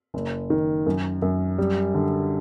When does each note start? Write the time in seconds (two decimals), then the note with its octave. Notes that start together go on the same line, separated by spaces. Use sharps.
0.14 F#1
0.50 D#3
0.86 F#2
1.22 F#2
1.58 G3
1.94 D3